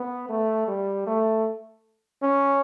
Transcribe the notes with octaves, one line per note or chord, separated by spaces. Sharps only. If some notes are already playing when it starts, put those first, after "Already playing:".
Already playing: B3
A3
G3
A3
C#4